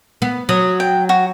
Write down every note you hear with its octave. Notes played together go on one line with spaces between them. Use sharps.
B3
F#3 D#6
G5
F#4